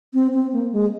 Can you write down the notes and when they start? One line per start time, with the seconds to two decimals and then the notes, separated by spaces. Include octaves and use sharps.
0.14 C4
0.34 C4
0.53 A#3
0.72 G#3